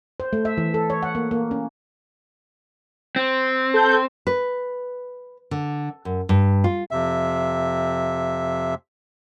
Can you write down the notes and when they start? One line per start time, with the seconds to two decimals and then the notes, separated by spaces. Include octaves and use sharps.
0.20 C5
0.33 A3
0.45 E5
0.58 E3
0.74 A4
0.90 C#5
1.03 F#5
1.15 A#3
1.31 A#3
1.51 C#4
3.16 C4
3.74 A4 G6
4.27 B4
5.51 D3
6.05 F#2
6.29 G2
6.64 F4
6.91 F2 C3 E5